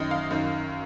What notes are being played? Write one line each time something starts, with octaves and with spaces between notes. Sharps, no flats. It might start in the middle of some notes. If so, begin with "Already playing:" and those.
Already playing: F#2 D#3 D#5
F5
F#2 D#3